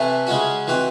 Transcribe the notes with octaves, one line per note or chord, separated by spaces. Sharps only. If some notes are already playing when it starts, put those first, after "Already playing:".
Already playing: C3 E3 A3 E4
C#3 G#3 C#4 F#4
E3 C4 F#4